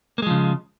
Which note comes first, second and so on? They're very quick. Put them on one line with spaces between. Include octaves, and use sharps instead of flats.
A#3 G#3 F3 C#3